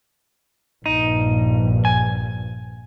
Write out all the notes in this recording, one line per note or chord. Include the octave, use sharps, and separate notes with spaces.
A#1 G2 D#4
G#5